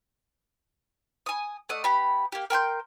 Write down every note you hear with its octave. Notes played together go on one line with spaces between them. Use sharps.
G#5 D#6
A3 D5 D#5 F#5
B3 G4 B5
A#3 G4
A#4 G5 C6 G6